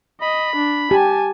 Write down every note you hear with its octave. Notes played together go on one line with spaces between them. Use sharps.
D#5 B5
D4
G4 G#5 A5